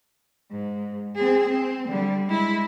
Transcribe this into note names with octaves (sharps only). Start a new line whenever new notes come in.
G#2
C4 G#4
C4
D3 G3
G#3 E4